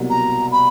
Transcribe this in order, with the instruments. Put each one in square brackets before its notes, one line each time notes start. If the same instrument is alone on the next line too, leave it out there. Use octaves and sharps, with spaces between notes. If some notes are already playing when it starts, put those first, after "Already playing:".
Already playing: [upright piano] C2 B2 F#3 A#3
[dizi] A#5
B5